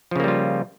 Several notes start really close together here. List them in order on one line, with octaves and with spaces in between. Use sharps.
F3 C#3 A#3 G3 F4